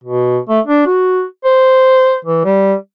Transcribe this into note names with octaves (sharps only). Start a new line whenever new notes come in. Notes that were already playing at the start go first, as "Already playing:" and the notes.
B2
A3
D4
F#4
C5
E3
G3